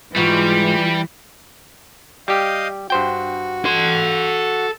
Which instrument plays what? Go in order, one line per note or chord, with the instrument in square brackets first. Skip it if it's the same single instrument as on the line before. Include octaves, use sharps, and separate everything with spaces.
[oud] G#2 G#3 F#4 [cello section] E3 [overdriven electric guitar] G3 [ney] F4
[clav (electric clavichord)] G3 G4 [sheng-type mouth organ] D#5 F5 G5
[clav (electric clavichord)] G2 C5 G5 [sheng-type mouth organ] F#4
[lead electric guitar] A4 C6